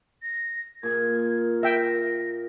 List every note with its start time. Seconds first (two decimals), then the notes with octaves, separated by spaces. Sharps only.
0.23 A#6
0.83 A#2 G#4 A#4 G#6
1.63 E5 G5 A#6